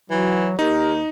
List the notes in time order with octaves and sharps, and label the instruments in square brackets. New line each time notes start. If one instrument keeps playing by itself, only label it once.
[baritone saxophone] E3 [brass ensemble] F#3
[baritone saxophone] D#2 [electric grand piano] D#4 [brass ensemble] G4 A#4